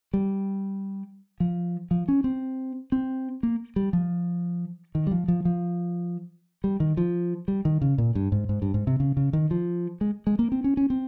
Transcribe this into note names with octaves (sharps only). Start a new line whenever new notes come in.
G3
F3
F3
C#4
C4
C4
A#3
G3
F3
D#3
G3
F3
F3
F3
G3
D#3
F3
G3
D#3
C#3
A#2
G2
G#2
G#2
G2
G#2
C3
C#3
C#3
D#3
F3
G#3
G#3
A#3
C4
C#4
C#4
C4